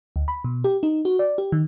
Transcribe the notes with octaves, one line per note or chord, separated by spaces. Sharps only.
D2
B5
B2
G4
D#4
F#4
D5
G4
D#3